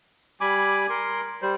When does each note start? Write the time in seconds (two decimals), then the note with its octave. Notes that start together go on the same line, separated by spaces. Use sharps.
0.41 G3 G#5 B5 D6
0.90 A#4 C6
1.42 G3 C5